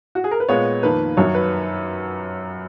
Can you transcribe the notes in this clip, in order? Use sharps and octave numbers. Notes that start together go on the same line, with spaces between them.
F#4
G#4
A#4
B4
A#2 G#3 B3 C#5
F2 D#3 A#3 B4
F#2 D#3 F#3 C#5
B4